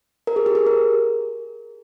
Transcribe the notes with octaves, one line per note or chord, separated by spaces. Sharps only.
A#4
G#4
G4
G#4
A#4